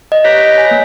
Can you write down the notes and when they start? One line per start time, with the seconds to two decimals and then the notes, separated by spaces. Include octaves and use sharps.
0.12 D#5
0.25 G4 B4 C#5 A#5
0.58 G#5
0.71 A#3